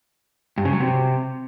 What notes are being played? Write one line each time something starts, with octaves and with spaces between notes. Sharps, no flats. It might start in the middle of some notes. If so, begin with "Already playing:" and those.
G2
C#3
F#3
C3